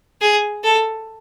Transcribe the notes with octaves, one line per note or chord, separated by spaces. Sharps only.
G#4
A4